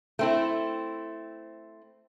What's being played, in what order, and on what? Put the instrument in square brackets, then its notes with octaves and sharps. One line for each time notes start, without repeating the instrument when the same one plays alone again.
[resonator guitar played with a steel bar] A3 C4 E4